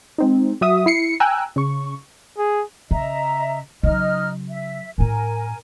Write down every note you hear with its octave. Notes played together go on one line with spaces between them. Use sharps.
G#3 C4 D#4
F#3 F#4 E5 D#6
E4 C7 C#7
G5 G#5 A#5 E6 F#6
C#3 C#6
G#4
C#3 D#5 E5 A#5
C#3 F#3 D#4 D#5 F6
E5
A2 E4 A#4 G#5